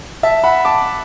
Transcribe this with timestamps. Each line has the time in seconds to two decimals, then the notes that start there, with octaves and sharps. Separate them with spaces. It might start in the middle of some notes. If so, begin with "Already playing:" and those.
0.23 E5 A5
0.44 F#5 B5
0.65 A5 D6